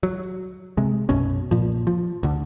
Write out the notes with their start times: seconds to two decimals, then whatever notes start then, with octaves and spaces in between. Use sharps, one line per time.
0.03 F#3
0.77 C3 G#3
1.09 B1 F#2 B2 C#4
1.51 A#2 F3
1.87 F3
2.23 D2 D3